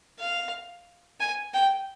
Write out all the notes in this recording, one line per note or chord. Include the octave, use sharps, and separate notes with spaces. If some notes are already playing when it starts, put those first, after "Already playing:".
F5
G#5
G5